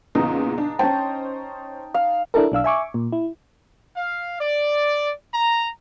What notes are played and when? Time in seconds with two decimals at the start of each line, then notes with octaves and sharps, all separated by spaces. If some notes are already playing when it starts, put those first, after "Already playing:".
0.15 E2 A#2 C#3 D#4
0.58 D4
0.79 C#4 C5 G5 A5
1.94 F5
2.34 D4 E4 A4 A#4
2.52 B1 D4 F5 E6
2.64 E5 G#5 C#6 D6
2.94 A#2
3.13 E4
3.97 F5
4.40 D5
5.34 A#5